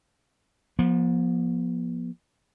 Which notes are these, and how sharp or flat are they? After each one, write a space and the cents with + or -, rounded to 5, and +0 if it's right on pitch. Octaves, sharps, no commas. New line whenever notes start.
F3 +10 B3 -45